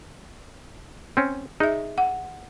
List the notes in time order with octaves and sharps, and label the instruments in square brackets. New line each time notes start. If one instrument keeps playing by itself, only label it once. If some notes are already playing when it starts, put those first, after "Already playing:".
[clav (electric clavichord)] C4 C#4
[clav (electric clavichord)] D#4 [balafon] G#4 E5
[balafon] F#5